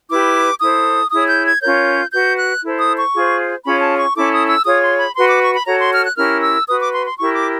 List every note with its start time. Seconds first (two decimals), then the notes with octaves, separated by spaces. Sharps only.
0.10 E4 G4 B4 D6
0.61 E4 A4 C5 D#6
1.11 E4 G#4 C#5 D#6
1.28 G6
1.46 G#6
1.62 C#4 F4 A#4 C#5 G6
2.12 F#4 B4 G6
2.38 F#6
2.63 E4 A4 C5
2.79 D#6
2.97 C#6
3.13 F4 G#4 C5
3.64 C#4 F4 G#4 C#5 B5
3.80 A5
3.98 C#6
4.15 C#4 E4 A4 D6
4.32 D#6
4.48 E6
4.65 F4 G#4 C#5 D#6
4.82 C6
4.99 B5
5.16 F#4 B4 C6
5.29 D6
5.42 C#6
5.54 B5
5.66 F#4 A4 C#5 A#5
5.79 C6
5.92 F6
6.05 F#6
6.17 C#4 E4 G4 A#4 F6
6.42 E6
6.68 F#4 B4 D#6
6.80 D6
6.93 C6
7.06 C6
7.18 E4 G4 A#4 C#6
7.34 D6